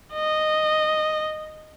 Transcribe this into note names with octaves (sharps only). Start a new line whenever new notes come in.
D#5